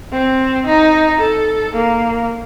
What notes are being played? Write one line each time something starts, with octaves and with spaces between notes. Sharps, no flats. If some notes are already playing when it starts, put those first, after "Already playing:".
C4
D#4
A4
A#3